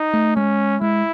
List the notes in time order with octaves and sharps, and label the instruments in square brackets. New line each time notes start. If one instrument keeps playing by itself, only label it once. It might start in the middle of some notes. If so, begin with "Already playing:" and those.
Already playing: [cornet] D#4
[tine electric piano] A3
[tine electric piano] G#3 [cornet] C#4
[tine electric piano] G#3 [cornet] E4